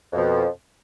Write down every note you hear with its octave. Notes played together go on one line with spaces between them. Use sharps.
F2 B2 F3